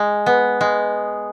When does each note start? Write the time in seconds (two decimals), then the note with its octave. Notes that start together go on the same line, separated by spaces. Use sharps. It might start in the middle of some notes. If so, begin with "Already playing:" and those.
Already playing: G#3
0.26 B3
0.61 G#3